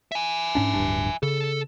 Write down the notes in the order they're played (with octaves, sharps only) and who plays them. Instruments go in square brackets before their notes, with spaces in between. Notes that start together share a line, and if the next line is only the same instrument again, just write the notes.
[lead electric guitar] E5 G#5
[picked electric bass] G#2 C#4 D4
D1 G2 D4
[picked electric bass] C#3 [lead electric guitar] A4